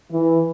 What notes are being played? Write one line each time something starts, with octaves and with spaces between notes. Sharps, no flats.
E3